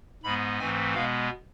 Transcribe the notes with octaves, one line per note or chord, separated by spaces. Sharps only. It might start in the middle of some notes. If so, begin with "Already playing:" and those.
G#2 G#3 B3 B5
G#2 E3 A3 C4 G#5
B2 G#3 B3 F5